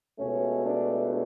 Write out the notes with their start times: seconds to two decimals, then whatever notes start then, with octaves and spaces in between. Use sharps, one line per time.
0.18 C#2 B2 A3 C#4
0.66 D4